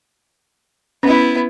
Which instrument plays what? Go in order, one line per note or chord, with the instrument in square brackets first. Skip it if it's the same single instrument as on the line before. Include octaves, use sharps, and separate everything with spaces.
[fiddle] B3 E4 [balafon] C#4